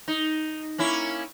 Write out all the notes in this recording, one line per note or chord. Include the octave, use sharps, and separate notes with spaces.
D#4
A#3 C#4 E4